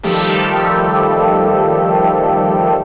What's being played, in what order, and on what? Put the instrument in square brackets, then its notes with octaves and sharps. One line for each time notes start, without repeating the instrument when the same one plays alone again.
[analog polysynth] D#3 F3 G3 A3 G4 A4